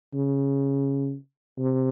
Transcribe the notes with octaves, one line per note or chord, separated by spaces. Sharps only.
C#3
C3